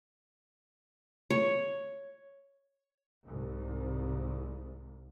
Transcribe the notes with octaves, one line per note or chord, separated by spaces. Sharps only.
C#5
C2 G#2